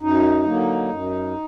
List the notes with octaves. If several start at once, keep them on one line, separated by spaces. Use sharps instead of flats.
F#2 D#4
D3 F#3 A#3
F#2